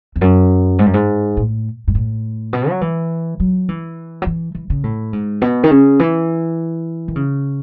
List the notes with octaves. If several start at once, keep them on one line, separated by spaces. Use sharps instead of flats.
E2
F#2
G#2
F#2
G#2
A2
G#2
A2
B2
F#3
E3
F#3
E3
F#3
E3
E3
C#3
A2
G#2
B2
D#3
C#3
E3
D#3
C#3